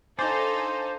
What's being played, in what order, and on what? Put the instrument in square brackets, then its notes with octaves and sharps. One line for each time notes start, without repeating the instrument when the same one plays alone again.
[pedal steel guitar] D4 F4 D5 [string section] D#4 A4 [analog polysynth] C5 [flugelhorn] G#5